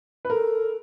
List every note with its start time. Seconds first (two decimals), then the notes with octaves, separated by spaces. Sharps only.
0.25 B4
0.30 A4 A#4